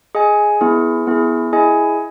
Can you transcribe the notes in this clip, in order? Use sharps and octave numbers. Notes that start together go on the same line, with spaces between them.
G#4 D#5 G#5
B3 E4 G#4
B3 E4 G#4
E4 G#4 D#5 G#5